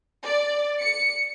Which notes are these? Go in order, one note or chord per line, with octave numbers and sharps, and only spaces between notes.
D5
C#7